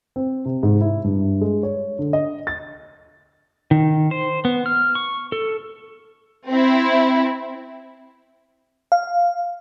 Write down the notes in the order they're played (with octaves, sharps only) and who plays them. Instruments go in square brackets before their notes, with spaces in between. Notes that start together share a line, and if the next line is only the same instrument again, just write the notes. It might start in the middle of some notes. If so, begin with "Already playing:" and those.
[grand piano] C4
C3
G#2
E4
G2
G#3
C#5
D3
D#5
A6
[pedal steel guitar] D#3
C5
B3
F6
C#6
A4
[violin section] C4 E4
[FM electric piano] F5